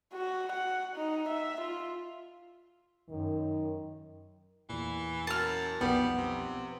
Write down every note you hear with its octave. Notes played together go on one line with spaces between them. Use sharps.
F#4
F#5
D#4
E5
F4
F#2 D#3
E2 A#2 E3
F#2 A5 F6
B1 F2 G3 B3
C3